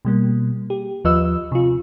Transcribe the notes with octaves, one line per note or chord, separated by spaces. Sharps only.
B2 G3 A#3
G4
D#2 F3 F4 B4 D#5 E6
C3 F4